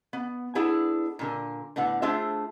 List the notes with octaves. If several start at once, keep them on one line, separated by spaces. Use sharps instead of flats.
B3
B3 D4 E4 G#4 A4
A#2 D3 A#4
A2 D3 B3 F#5
A3 D4 F4 G#4 C5 E5